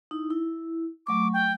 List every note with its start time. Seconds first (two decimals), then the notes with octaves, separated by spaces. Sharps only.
0.11 D#4 E4
0.30 E4
1.07 F#3 A3 C#6 D6
1.33 G5